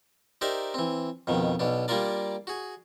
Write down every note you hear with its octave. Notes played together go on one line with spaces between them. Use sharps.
D#4 G4 A#4 C5 D5 E5
E3 C4
F2 B2 D#3
B1 B2 D4
G3 A#3 D4 F4 A#4 D5
F#4 G#4